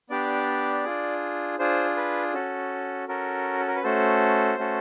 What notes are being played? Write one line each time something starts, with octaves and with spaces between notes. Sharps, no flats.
B3 D4 G4 D5
D4 F4 G#4
D4 F4 G#4 C5
B4
C#4 F#4 A4
C#4 F#4 A4 A#4
A4
A#4
B4
A3 C#4 F#4 A4 C5
A3 C#4 F#4 A4